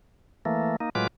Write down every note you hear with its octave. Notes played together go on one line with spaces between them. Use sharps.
E3 A3 A#3
A#3 D#4
A2 F#3 G#3 F4 B4 D6